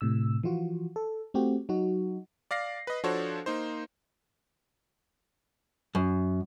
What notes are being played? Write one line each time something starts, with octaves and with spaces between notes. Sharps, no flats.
A2 C3 E6
E3 F3 F4 F#4
A4
A3 C4 F#4 G4
F#3 D#4 F#4
D5 F5 A#6 C7
B4 D#5
F3 D4 F#4 A4 C5 C#5
A#3 D#4 C5
F#2